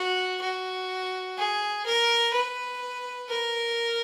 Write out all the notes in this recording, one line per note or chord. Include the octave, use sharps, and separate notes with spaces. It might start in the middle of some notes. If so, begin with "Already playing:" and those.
Already playing: F#4
F#4
G#4
A#4
B4
A#4